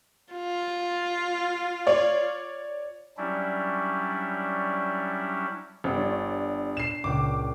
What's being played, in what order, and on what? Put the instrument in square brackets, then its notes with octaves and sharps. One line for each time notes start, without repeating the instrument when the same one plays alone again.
[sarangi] F4
[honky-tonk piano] C#5 D5
[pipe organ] F#3 G3 C#4 D4 E4
[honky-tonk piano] G1
[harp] D4 C#5
[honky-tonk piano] C7 E7
[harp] C#2 A#2 G5 [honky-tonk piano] D6